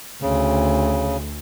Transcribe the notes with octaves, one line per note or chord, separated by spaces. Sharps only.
D2 C#3